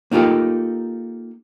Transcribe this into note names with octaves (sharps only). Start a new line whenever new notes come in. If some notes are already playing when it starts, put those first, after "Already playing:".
A#3 D#4 F4 G4 A4